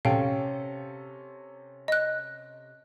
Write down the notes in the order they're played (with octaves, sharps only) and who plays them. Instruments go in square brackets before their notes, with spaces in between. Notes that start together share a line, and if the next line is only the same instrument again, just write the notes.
[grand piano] C3 C#4 A4 [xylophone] F5 G5
[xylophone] D#5 F#6